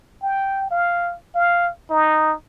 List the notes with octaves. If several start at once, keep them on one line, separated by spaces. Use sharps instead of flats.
G5
F5
F5
D#4